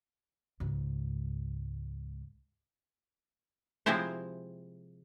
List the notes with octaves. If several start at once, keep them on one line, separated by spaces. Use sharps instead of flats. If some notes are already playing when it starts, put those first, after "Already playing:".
C#2 G#2
C3 F3 G#3 C4 E4 C5